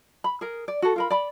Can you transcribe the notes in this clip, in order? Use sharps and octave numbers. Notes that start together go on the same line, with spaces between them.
B5
G#4 A#4
D5
F#4 A4
F4 A#4 B5
D5 B5